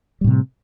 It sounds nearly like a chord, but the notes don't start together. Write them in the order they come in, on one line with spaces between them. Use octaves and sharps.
G3 A2 C3